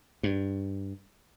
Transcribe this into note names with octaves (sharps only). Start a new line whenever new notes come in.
G2